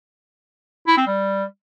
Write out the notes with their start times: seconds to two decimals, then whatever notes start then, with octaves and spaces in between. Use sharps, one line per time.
0.87 E4
0.97 C4
1.07 G3